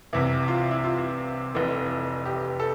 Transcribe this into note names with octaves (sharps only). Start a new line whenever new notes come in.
C2 C3 E3 E4
F4
E4
F4
F1 F2 E3
G4
A4